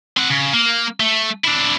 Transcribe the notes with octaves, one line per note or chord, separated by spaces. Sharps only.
C4 F#5
C#3
A#3
A3
D4 E4